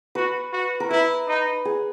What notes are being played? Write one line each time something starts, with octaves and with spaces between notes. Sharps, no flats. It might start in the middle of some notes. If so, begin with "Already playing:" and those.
F#4 B4
F#4
A#4
E4 B4
D#4
G#4